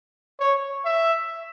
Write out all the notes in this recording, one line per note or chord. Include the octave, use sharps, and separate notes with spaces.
C#5
E5